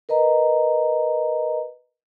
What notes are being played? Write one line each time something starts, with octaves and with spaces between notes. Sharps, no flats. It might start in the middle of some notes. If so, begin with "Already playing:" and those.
A#4 B4 D#5 A#5